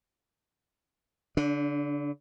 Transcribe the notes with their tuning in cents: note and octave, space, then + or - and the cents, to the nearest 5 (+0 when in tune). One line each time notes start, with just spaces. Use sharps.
D3 -40 D4 +0